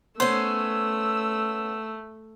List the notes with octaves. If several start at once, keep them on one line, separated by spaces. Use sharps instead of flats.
A3 B3 C#4 C5 E6